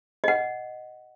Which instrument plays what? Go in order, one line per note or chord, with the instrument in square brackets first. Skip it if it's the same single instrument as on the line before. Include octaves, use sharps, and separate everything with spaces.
[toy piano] D#5 F#5